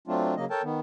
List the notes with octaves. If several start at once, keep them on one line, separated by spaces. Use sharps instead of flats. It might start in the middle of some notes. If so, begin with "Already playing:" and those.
F#3 A3 C4 D4 F4
C#3 F#3 A#3 D#5
A4 A#4 C#5 G5 A5
D#3 B3